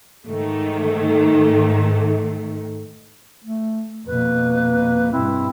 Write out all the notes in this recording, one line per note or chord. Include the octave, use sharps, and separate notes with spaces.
G#2 D#3 A3
A3
F2 B2 A#3 B4
G2 B2 C4 E4